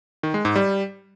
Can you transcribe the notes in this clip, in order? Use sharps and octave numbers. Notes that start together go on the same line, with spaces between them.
D#3
G#3
G#2
G3